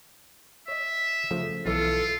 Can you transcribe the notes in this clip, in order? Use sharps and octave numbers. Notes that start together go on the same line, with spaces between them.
C#5 D#5 E5
C#3 F3 A3
B1 E3 F4 A4 E5